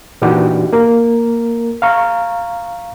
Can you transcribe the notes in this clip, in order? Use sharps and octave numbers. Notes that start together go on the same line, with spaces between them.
A#2 E3 D4 D#4 F#4 G4
A#3 A#4
F5 A#5 C#6